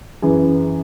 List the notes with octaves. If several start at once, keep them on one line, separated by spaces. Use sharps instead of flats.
F#2 E3 G#4